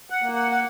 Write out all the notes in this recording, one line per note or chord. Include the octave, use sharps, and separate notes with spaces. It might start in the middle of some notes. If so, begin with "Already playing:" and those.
F#5
A#3
F#5
F#5